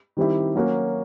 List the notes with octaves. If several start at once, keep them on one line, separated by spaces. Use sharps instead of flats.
D#3 G3 C4 E4 G4
F#3 A#3 C#4 F#4